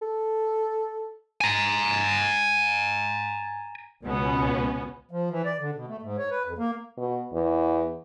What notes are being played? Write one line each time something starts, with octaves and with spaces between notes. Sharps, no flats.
A4
G#5 A#5
C#2 B2 B3 C#4
F3
E3
D5
D3
B2
A3
G#2
C#5
B4
F2
A#3
B2
E2